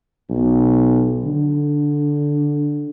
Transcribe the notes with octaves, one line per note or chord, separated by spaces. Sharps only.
B1
D3